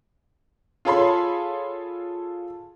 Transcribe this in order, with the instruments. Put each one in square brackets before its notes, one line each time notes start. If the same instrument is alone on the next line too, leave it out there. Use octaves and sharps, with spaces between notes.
[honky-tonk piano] F4 G#4 A4 C#5 B5 C6